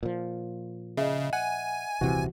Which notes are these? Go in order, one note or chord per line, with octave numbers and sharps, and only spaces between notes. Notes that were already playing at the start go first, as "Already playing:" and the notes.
A#2 F3
C#3 D#5 E5
F#5 G#5
D#1 C2 C3 E3 F#4